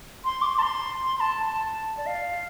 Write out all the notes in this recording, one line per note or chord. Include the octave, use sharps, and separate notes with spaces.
C6
D6
C6
A5
C6
C6
A5
A5
D5
F5